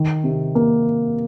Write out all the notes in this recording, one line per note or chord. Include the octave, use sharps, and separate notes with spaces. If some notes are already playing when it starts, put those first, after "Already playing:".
Already playing: D#3
C3
A#3